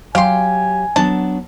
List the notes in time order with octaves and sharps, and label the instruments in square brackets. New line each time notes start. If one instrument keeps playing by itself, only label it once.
[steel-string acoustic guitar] F#3 G4 G5 [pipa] F5 C6 [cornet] G#5
[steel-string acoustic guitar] F#3 B3 D4 [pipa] A5